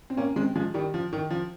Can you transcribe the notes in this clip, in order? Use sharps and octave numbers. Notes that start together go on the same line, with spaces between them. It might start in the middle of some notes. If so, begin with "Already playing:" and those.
C4
A#3 C#4
G#3 C4
F3 G#3
D#3 G3
F3
D#3
F3